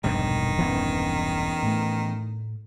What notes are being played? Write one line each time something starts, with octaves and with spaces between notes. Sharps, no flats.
E1 A#1 G2 B2 D#3 G3
E3 B3 C#4
A2 A3